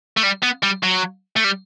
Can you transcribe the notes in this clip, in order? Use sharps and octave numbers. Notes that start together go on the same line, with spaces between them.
A3
G3
B3
G3
F#3
A3
G3